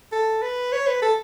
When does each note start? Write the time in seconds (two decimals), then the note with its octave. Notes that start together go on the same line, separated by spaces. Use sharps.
0.12 A4
0.42 B4
0.72 C#5
0.87 B4
1.02 A4